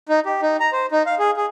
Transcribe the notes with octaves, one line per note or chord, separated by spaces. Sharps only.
D#4
G4
D#4
A#5
C5
D#4
F5
G#4
G#4